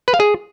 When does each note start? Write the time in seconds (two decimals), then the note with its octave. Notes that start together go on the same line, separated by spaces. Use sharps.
0.08 B4
0.14 F5
0.20 G#4